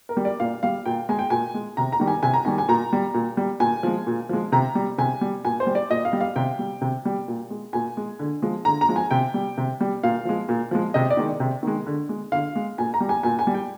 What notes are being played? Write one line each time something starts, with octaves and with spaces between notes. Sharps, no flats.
A#4
G3
D5
A#2 F5
G3 F5
A#2 G5
G#3 G#5
G5
A#2 G#5
G#3
C3 A#5
A#5
D#3 G3
G#5
C3 G#5
A#5
D#3 G3 G#5
G#5
A#2 A#5
G3
A#2
G3
A#2 G#5
F3 G#3
A#2
F3 G#3
C3 A#5
G3
C3 G#5
G3
A#2 G#5
C5
G3
D5
A#2 D#5
F5
G3
F5
C3 G5
G3
C3
G3
A#2
G#3
A#2 G#5
G#3
D3
F3 G#3
D3 A#5
A#5
F3 G#3
G#5
C3 G5
G3
C3
G3
A#2 F5
F3 G#3
A#2
F3 G#3
C3 D#5
D5
D#3 G#3
C3
D#3 G#3
D3
G#3
D3 F5
G#3
A#2 G#5
A#5
G3
G#5
A#2 G#5
G#5
G3
G5